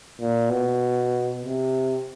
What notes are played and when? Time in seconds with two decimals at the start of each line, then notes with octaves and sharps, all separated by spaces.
0.20 A#2
0.50 B2
1.42 C3